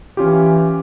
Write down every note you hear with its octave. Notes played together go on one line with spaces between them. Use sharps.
E3 C#4 F4 G4